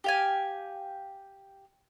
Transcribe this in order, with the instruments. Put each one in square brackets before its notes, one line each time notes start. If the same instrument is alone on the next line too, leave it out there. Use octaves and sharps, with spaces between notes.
[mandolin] G4 F5 G#5